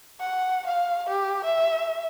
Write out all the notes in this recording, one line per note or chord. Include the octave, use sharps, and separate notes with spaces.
F#5
F5
G4
E5